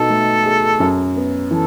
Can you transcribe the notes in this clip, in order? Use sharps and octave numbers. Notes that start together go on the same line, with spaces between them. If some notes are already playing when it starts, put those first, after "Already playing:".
Already playing: B2 D#4 A4
A3
G#4
F#2
B3
E3 A4